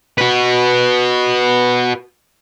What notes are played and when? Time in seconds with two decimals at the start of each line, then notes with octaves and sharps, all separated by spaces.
0.18 F#4 B4